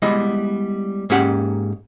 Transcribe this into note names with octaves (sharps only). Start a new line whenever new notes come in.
G3 G#3 B3 E4 D#5
G#2 A#3 C#4 G4 F#5